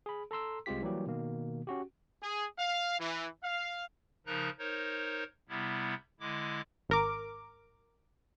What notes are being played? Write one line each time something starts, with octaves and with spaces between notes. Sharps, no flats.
G#4 B5
A4 A#5 C6 E6
C2 G#3 C4 F4 G4 B6
E3 F#3 G3 A#3 G4
B2 D#3 A#3
C#4 F#4 G4
G#4
F5
E3
F5
C#3 F3 D#4 A#4 A#5 F#6
D#4 A#4 C5 C#5
C3 G3 B3 E4
D3 G#3 E4 D6
G#1 A#4 D6